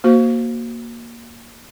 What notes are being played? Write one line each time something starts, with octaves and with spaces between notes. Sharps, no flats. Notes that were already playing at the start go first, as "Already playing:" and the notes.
A#3 F#4 C5